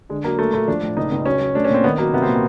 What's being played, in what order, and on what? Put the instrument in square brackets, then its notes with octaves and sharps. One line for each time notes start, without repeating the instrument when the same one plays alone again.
[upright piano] D3 [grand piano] G#3
[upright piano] F#3 [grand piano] A#3
[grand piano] A3 [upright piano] A#3
[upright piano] A#2 [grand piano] A3
[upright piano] F3 [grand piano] D4
[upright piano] A2
[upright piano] C#2 [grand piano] D#4
[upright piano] C#2
[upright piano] F#3 [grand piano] C#4
[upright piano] F#3
[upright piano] A3 [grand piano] D4
[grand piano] C#4
[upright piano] A#2 [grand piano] C4
[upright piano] D#3 [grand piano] B3
[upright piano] F#3 [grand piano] A#3
[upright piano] C2 [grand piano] B3
[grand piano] C4
[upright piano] A#2